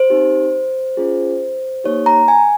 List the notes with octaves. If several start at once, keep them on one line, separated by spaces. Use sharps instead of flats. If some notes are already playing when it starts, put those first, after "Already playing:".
Already playing: C5
C4 D#4 G4
C#4 F4 G#4
A#3 D#4 G4 C#5
A#5
G#5